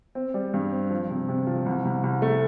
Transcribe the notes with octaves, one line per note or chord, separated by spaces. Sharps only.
C4
G3
G2
C4
F3
C3
C3
F3
C2
C2
C2
A3